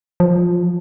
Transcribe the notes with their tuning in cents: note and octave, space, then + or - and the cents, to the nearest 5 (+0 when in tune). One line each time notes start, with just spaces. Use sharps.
F3 +15